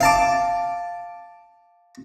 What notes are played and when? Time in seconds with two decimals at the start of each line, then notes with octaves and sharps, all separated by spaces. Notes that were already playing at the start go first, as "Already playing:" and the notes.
0.01 F5 A5 D6